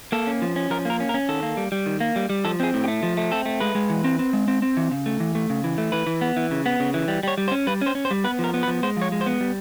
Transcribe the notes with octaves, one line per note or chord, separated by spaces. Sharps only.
A#3 A4
C#4
F3
C#4
F3 A#4
A#3 A#4
C#4
A#4
C#4
D#3 A4
A#3
G3
G3
D#3
A#3
G3
G3
F3 A4
C4 G#4
A2
G4
A3
F3
A3
C4 A4
A3
G#3 B4
G#3
E3
C4
C4
G#3
C4
C4
E3
C#3
A3
E3
A3
C#3
E3
A3
E3 B4
E3
B3
E3
C#3
B3
C#3
E3
G3
G3 C#5
G3
C5
C#4
G3 B4
C#4
C5
C#4
C5
G3
B3 B4
F3
A#4
B3
B4
F3
G#3 C5
F3 C#5
G#3
C5
B3
G3